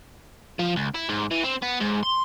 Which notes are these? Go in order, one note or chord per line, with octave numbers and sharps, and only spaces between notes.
F3
C#2
E4
G#2
E3
C4
B3
G#2
C6